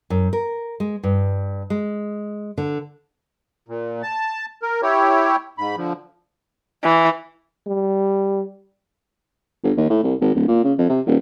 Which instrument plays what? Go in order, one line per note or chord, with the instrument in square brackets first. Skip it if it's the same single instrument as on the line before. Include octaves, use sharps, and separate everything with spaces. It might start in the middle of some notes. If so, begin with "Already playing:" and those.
[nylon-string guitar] F#2
A#4
G#3
G2
G#3
D3
[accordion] A#2
A5
A#4
E4 G4 C#5
G#2 B5
D3 F3
[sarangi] E3
[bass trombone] G3
[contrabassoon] G1
D#2
A2
C2
G#1
D1
A#2
C#3
F2
C3
D#1